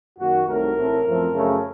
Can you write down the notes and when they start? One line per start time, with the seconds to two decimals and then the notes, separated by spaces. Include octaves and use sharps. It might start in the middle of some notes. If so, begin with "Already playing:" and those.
0.19 F#2 D#3 A#3 F#4
0.47 C2 C3 D#3 F#3 A3 A#4
0.77 A1 A2 A3 C4
1.06 F#2 F3 A3 C4
1.34 F#2 C#3 A3